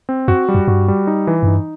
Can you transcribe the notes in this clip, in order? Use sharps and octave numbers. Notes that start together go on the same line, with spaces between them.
C4
F#2 F#4
G3
F#2
G2 F#4
G3
D#4
E3
F#2
G2 D#4